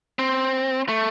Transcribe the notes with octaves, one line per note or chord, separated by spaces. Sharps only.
C4
A3